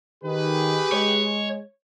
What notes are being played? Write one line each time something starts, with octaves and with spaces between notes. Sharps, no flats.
D#3 G4 G#4 B4
G#3 C#5